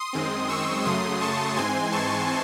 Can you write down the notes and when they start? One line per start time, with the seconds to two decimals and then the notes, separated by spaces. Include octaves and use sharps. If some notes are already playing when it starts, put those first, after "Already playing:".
Already playing: C6 D#6
0.13 F#2 D#3 G#3 C4
0.49 C#6 E6
0.85 F#2 C#3 F#3 A3 C6 D#6
1.21 A5 C#6
1.56 G#2 E3 G#3 C4 G#5 C6
1.92 A5 C#6